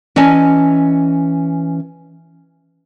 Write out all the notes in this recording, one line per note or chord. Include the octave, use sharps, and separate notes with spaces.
E3 C#4 D#5 G#5 A5